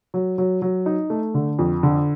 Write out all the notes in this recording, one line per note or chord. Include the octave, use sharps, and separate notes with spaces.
F#3
F#3
F#3
D#4
A3
D3
F2
D3